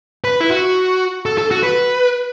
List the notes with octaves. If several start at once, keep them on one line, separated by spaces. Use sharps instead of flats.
B4
E4
F#4
A4
A4
F#4
B4